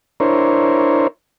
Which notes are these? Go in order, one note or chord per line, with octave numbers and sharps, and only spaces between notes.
D4 E4 A#4 C5 C#5